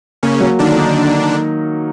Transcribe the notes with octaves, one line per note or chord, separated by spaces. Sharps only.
C#3 A#3 C#4
F#3
D3 D#3 D4
D#4